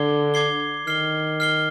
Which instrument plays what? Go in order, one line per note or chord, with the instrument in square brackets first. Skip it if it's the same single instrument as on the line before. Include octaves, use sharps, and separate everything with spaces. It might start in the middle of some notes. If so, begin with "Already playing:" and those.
Already playing: [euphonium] D3 [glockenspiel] D6 G#6 C7 G7
[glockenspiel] D6 G#6 C7 G7
[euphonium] D#3 [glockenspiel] F6 C7 G7
[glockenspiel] F6 C7 G7